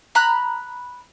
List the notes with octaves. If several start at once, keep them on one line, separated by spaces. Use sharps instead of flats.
A#5 B5 F#6